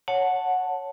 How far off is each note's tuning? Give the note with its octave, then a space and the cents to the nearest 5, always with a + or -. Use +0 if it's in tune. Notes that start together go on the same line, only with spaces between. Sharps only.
C#5 +0 F#5 -10 A5 +0